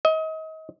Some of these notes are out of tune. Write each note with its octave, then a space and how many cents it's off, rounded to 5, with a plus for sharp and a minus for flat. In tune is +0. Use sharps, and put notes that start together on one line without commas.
D#5 +35